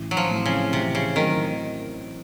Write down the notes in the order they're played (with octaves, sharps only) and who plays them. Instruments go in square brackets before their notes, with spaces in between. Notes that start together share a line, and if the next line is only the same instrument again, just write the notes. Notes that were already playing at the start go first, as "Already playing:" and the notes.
Already playing: [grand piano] A1
[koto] F#3
F3
[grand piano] A2 F#3 C4
[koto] C#3
[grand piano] A1 [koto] C3
[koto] C#3
[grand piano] A2 F#3 C4 [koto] D#3